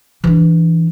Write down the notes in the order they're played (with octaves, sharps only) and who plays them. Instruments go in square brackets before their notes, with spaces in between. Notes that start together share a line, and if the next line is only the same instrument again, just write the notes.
[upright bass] E3 D4